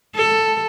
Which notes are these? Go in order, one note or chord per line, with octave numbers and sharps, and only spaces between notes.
A4